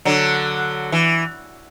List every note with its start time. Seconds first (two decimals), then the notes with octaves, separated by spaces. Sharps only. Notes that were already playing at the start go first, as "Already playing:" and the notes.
0.05 D3 F#3
0.92 E3